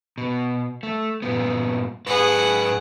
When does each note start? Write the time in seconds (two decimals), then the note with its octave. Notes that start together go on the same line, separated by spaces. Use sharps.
0.18 B2
0.83 A3
1.22 G2 A#2 B3
2.06 G#2 G#4 B4 F#5